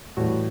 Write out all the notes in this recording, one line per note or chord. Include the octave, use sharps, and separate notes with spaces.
A2 E3 G3 F#4